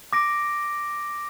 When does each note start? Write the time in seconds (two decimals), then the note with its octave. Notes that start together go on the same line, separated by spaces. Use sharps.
0.13 D6 A#6 D7